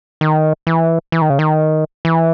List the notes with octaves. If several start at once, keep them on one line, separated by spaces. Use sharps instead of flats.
D#3
E3
E3
D#3
C#3
D#3
E3